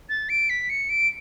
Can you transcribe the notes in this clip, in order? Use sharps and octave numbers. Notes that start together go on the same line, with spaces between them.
A6
D7
B6
C#7
D7